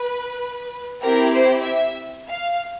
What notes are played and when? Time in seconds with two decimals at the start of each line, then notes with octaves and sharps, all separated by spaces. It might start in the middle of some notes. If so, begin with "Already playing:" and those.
Already playing: B4
1.02 C4 E4 G4 A#4
1.33 C5
1.64 E5
2.28 F5